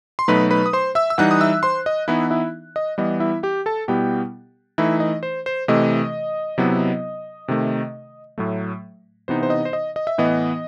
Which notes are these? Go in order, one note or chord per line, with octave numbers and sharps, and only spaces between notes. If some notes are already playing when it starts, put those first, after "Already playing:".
C6
B2 F#3 A3 D#4 B4 B5
B4 B5
D#6
C5 C6
E5 E6
E6
E3 G3 D#4 F#5 F#6
D#6
E5 E6
C5 C6
D#5
E3 B3 D#4 E4 E5
E4 E5
D#5
E3 G3 B3 D#5
E4 E5
G4 G5
A4 A5
B2 G3 B3 E4 G4 G5
E3 A3 D#4 E4 E5
D#5
C5
C5
C3 E3 A3 D#5
C3 F#3 B3 E4
C3 D#3 A3
A2 F#3 A3
C3 E3 B3 D#4 C5
C5
D#5
C5
D#5
D#5
E5
A2 E3 B3 D#5